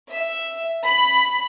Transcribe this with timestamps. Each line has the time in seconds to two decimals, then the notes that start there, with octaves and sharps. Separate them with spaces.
0.11 E5
0.83 B5